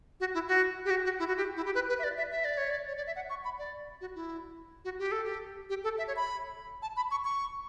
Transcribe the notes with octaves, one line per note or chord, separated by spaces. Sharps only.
F#4
E4
F#4
G4
F#4
F#4
E4
F#4
G4
E4
G4
B4
B4
E5
D5
E5
E5
D5
C#5
D5
C#5
D5
E5
F#5
C#6
B5
D5
F#4
E4
F#4
G4
A4
G4
G4
A4
E5
C#5
B5
A5
B5
C#6
C#6